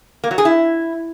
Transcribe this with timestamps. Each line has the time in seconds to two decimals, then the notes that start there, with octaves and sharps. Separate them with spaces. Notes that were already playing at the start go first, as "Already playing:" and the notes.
0.24 A#3
0.31 F#3
0.38 G#4
0.45 E4